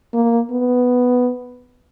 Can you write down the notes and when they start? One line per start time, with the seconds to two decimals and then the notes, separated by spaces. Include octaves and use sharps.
0.14 A#3
0.51 B3